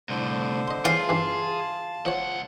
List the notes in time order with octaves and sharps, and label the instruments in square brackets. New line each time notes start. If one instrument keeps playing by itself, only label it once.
[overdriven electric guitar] C2 A2 [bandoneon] D3 C5
[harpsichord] D#5 C6
[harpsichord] E3 C#4 [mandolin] F4 [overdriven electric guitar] G#4
[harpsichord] G2 C#3 E3 [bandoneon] A5
[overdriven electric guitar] C#2 F#5 [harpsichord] F3 C#5